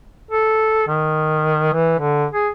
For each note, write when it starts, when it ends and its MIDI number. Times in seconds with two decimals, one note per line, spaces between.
0.31 0.85 69
0.87 1.68 51
1.73 1.94 52
1.98 2.26 50
2.31 2.49 68